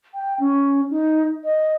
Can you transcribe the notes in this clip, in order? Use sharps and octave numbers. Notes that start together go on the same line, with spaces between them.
G5
C#4
D#4
D#5